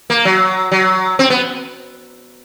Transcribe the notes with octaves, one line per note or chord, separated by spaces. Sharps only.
A#3
F#3
F#3
C4
B3